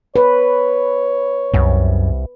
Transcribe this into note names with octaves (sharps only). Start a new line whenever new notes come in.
B4 C#5
C2 F#2